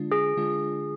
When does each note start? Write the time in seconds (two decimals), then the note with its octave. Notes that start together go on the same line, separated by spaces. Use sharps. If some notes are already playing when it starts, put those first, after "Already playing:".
Already playing: D3 G#3 D4 F4
0.12 G#4
0.37 D3 G#3 D4 F4